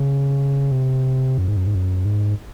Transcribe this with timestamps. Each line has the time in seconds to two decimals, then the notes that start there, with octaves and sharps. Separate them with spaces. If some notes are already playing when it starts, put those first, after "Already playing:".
Already playing: C#3
0.72 C3
1.38 F#2
1.48 G#2
1.57 F#2
1.67 G#2
1.75 F#2
2.05 G#2